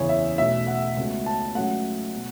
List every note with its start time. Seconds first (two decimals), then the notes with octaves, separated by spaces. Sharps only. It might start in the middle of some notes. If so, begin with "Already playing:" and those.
Already playing: F#1 E2 C#3 E3 C#5
0.09 E5
0.38 B1 B2 A3 E5
0.67 F#5
0.97 C#2 B2 A3
1.26 A5
1.55 C#2 C#3 F#3 A3 F#5
2.16 B2